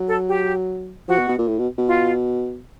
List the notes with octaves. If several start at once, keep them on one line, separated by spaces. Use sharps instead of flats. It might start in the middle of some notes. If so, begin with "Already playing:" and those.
Already playing: F#3
A4
G4
F3 F#4
B2
B2
A#2
A2
B2
B2
F4